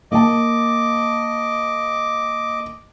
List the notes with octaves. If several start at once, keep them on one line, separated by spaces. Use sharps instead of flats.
A#3 D#5 A5 D6